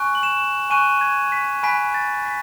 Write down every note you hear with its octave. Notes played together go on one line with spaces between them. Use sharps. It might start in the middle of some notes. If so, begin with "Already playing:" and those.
Already playing: G#5 C#6 F#6
F#7
E7
G#5 C#6 F#6 D#7
G#6
B6
G#5 B5 F#6 B6
A6
B6